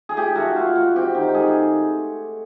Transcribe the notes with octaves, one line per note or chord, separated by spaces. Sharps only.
G#4
A3 G4
A3 F#4
A3 F4
A3 F#4
C4 G4
D#3 G4
A3 G#4